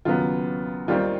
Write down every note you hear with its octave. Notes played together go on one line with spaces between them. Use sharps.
D#2 C#3 F#3 B3 F4
D#2 D#3 G3 C4 F4